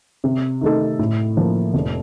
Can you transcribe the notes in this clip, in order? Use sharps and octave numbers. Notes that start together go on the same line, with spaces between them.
C3
D#3 A3 D#4 A4
A2
F3 A#3
F1